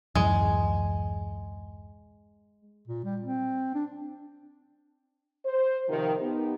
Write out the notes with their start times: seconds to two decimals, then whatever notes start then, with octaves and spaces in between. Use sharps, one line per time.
0.15 D1 F#2 E3 G#3
2.88 A#2
3.05 G3
3.21 C4
3.75 D4
5.46 C5
5.89 C3 D#3 F3
6.21 B3 D#4 G4